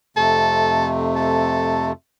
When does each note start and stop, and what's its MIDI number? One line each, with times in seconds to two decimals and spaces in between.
0.17 1.92 41
0.17 1.92 48
0.17 1.92 57
0.17 0.88 69
1.16 1.90 69